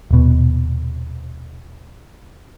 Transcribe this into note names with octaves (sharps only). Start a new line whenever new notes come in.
D#1 B2